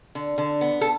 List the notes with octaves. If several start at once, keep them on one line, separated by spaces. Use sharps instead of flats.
D3
D3
B3
A4